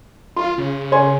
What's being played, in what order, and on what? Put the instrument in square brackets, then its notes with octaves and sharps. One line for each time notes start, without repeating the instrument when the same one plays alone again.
[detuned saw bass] F4 [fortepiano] C6
[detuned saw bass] C#3
[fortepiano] C#5 G#5 C6